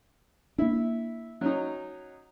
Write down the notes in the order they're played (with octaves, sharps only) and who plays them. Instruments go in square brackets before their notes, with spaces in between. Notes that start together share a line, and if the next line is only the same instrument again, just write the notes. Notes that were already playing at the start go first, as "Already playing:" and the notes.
[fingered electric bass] A#3 D4 [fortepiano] E4
[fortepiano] F#3 C#4 D#4